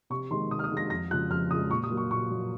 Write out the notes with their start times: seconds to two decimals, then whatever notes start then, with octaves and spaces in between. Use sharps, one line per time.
0.10 C3 C#6
0.31 D#3 G#3 C6
0.51 C3 D#6
0.59 F6
0.64 D#6
0.71 D#3 G#3
0.77 A#6
0.90 F2 A#6
1.11 C#3 F3 G#3 F#6
1.30 F2 F6
1.51 C#3 F3 G#3 D#6
1.70 A#2 C#6
1.84 D#6
1.91 F#3 A#3
1.97 C#6
2.11 A#2 C#6
2.30 F#3 A#3